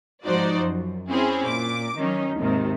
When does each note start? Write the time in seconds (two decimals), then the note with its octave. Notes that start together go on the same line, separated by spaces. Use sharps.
0.26 G#2 F3 D#4 F#4 C5 D5
0.61 F#2
1.10 C4 C#4 E4 G#4
1.44 A#2 D6
1.97 D#3 F#3 C#4 D#4
2.41 D#2 G#2 C3 D#3